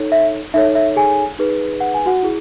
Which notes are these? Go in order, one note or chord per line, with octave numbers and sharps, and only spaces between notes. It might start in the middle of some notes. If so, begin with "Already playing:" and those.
Already playing: D#4 A4 C#5
E5
D#4 A4 C#5 E5
E5
G#4 G#5
D#4 G#4 B4
F#5
G#5
F#4 F#5
E4 G#4